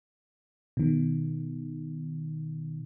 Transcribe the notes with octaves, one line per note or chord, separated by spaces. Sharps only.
B2 D#3